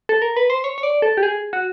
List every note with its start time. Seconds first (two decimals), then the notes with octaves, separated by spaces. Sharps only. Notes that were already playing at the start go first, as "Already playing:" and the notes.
0.09 A4
0.22 A#4
0.36 B4
0.50 C5
0.64 C#5
0.78 C#5
0.83 D5
1.02 A4
1.17 G4
1.23 G#4
1.53 F#4